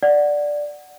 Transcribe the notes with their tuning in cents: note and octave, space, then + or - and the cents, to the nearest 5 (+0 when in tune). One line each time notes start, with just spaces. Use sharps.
D5 +0 F#5 +0